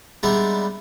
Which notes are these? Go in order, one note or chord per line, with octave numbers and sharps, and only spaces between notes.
G3 G#3 B3 D4 D#4 E5